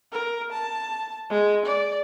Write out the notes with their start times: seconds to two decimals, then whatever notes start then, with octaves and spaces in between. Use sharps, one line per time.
0.12 A#4
0.52 A5
1.30 G#3
1.66 D5